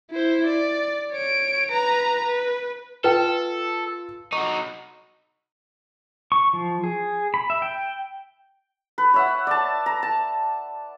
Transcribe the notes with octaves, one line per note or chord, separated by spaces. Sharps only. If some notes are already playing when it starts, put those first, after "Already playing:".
E4 C5
D5
C#5 D7
B4 A#5
B4
F4 A4 B4 G5
D#4 F#4 C#6
C#6
F3
G#4
B5
E5
G5
B4
C#5 E5 F#5
D5 A5
A#5
A5